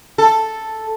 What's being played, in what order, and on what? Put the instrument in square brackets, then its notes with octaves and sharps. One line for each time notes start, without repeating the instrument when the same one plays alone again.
[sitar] A4